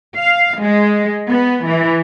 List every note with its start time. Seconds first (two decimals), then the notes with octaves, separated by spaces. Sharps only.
0.16 F5
0.59 G#3
1.26 B3
1.67 E3